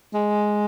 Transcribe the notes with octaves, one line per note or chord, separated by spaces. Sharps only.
G#3